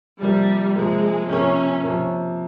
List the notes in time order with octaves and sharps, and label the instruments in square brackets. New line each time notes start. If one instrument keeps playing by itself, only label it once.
[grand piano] C3 F3 A#3 [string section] G3
[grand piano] C3 F3 A#3 [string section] G#3
[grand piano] C3 F3 A#3 [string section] C#4
[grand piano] C3 F3 A#3